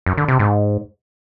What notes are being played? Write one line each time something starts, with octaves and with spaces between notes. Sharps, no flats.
F#2
D3
C3
G#2